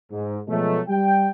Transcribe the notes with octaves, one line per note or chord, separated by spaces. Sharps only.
G#2
B2 F3 F#3 G#3 A3
G3 G5